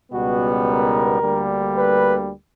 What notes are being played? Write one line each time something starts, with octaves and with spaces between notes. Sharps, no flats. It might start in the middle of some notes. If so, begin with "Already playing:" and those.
C#2 B2 G3 B3 F#4
A#4
D2 D3 G3 A#3
B4